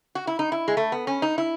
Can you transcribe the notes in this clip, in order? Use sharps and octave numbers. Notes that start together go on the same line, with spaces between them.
F#4
E4
D#4
E4
G#3
A3
B3
C#4
D#4
E4